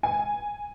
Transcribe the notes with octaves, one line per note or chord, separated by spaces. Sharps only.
G#5